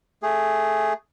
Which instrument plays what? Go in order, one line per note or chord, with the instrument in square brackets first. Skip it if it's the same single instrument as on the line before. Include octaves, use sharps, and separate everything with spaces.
[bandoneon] A3 G#4